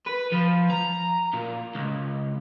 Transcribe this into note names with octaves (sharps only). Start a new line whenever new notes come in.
B4
F3
A#5
A#2
C#2